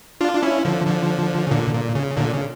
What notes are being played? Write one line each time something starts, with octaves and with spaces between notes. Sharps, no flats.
D4 F4
D4
C#4 E4
D3 F3
D3 F3
C#3
A#2 D3
A#2
C#3
A#2 D3
C#3